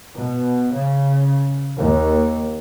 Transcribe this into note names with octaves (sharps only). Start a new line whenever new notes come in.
B2
C#3
D#2